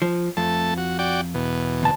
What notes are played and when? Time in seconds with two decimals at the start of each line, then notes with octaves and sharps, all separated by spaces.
0.02 F3
0.37 F2 A3 A5
0.78 F#4
0.99 F#4 D5 G5
1.35 E2 B2
1.83 D2 A5